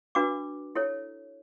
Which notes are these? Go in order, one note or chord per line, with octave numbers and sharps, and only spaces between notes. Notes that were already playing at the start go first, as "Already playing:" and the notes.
D4 F#4 B4 D6
E4 A4 C#5